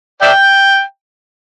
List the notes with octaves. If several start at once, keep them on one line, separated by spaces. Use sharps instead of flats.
D5 E5 G5